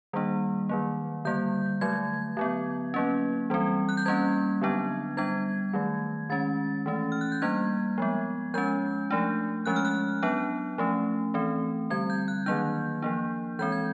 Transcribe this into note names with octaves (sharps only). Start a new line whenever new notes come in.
D#3 G3 A#3 D4
D#3 F#3 A#3
D3 G3 A#3 G6
D3 F#3 A3 G#6
D3 F#3 B3
F#3 A#3 C#4
E3 G3 C4
F#6
G6
G3 A#3 C#4 G#6
D3 F#3 B3 D4
G3 B3 D4 G#6
D#3 F#3 A3
D#3 G#3 C#4 A6
E3 A3 C#4
F6
F#6
G6
G3 A#3 D4 G#6
F3 G#3 B3
F3 G#3 C#4 G6
F3 A3 D4
F3 G#3 C#4 F#6
F6
F#6
F#3 B3 D4
F3 A3 C#4
E3 A3 C4
D3 G3 C4 G#6
G6
F#6
D#3 F#3 A#3 D4 G6
F3 A#3 D4
E3 G#3 C4 G6
G#6